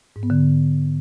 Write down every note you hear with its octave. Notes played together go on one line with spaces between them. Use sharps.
G#2
B3
D3